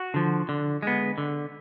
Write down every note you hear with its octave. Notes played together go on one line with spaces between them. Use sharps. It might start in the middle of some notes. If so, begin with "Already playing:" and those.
Already playing: F#4
D3 F3
D3
G#3 B3
D3